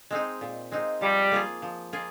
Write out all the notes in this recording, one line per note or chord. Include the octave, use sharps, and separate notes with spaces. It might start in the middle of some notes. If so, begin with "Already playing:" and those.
G#3 C4 D#4
A#2
G#3 C4 D#4
F3 G3
A#3 F4 G#4
F3
A#3 F4 G#4